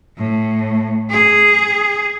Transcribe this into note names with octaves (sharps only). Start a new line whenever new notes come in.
A2
G#4